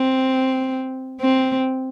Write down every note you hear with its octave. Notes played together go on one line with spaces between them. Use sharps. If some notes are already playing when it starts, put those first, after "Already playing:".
Already playing: C4
C4